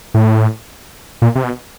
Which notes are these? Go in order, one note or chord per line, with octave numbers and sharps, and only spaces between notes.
A2
A#2
C3
B2